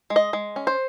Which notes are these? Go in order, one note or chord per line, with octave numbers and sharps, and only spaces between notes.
G#3
D#5
G#3
C#4
C5